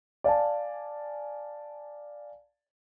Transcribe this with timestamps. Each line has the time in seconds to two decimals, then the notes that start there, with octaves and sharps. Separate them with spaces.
0.24 D5 F5 G#5 A5